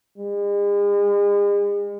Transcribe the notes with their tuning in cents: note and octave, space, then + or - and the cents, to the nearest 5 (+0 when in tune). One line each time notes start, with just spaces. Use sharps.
G#3 -40